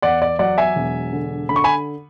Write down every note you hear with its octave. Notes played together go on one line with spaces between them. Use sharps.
E2 D5 F#5
D5
F#3 D5 F#5
E5 G#5
E1
D3
D3 B5
C#6
G#5 B5